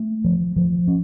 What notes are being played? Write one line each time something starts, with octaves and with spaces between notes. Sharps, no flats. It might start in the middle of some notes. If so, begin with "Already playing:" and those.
Already playing: A3
F3
F3
C#4